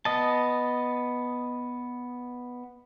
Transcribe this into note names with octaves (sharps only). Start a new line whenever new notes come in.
B3 D#5 A5